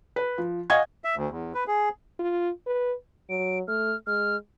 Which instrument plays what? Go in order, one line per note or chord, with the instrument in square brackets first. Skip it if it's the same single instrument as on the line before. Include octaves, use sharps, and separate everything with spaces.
[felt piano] B4
F3
D#5 F5 F#5 G#5 C#6 G#6
[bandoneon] E5
D2
E2
B4
G#4
[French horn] F4
B4
[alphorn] F#3 [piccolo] D7
[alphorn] A3 [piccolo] F6
[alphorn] G#3 [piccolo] F6